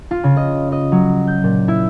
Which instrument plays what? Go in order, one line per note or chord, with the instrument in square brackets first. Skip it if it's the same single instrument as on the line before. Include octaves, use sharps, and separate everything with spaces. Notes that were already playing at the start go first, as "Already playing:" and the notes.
[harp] F4
C#3
D#5
D#5
F#3
G6
A#2
E4